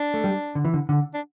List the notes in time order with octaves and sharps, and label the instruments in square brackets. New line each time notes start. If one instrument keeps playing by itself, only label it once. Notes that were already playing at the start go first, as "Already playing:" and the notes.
Already playing: [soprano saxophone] D4
[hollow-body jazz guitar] A3
G3
D3
E3
D3
D3
[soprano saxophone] D4